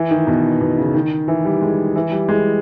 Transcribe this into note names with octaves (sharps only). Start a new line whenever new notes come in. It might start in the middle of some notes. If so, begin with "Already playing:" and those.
Already playing: E3
D#3
B2
B2
C#3
D#3
E3
G3
G#3
E3
G3
G#3